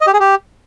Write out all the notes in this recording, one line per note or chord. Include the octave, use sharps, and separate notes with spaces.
D#5
G4
G#4
G4